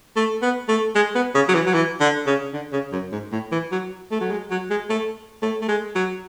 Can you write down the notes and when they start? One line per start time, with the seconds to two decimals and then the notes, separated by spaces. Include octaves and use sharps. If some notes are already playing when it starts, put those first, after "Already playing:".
0.16 A3
0.42 B3
0.68 A3
0.95 G#3
1.15 B3
1.35 C#3
1.48 F#3
1.54 E3
1.66 F#3
1.74 E3
2.00 D3
2.26 C#3
2.53 D3
2.72 C#3
2.92 F#2
3.12 G#2
3.32 A2
3.52 E3
3.71 F#3
4.11 A3
4.21 F#3
4.31 G#3
4.51 F#3
4.70 G#3
4.90 A3
5.42 A3
5.61 A3
5.68 G#3
5.95 F#3